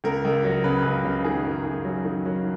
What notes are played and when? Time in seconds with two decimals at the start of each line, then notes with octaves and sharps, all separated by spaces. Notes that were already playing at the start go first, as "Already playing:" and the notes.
0.04 C#2 A#4
0.25 C#2
0.44 F#3
0.64 C#3 B4
0.85 C#2
1.04 C#3
1.25 D#3 G#4
1.44 F#2
1.65 F#2
1.85 F#3
2.05 D#3
2.25 F#3